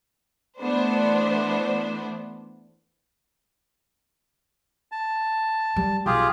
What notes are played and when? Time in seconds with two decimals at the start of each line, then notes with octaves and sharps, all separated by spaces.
0.60 E3 A3 B3 D4 C5
4.92 A5
5.76 G3
6.06 B1 F4 G4 G#4